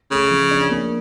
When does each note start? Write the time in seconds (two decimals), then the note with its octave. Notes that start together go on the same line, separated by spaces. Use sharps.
0.11 C#3 A3
0.31 F3
0.51 D4
0.71 A#3